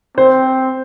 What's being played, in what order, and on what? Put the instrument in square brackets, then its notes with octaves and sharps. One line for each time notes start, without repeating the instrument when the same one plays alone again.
[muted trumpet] C4 [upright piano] C5